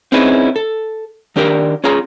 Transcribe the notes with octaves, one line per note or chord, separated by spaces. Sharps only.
C4 C#4 D#4 E4 G#4 B4
A4
D#3 D4 G4 A#4 D5
C#4 F4 G#4 A#5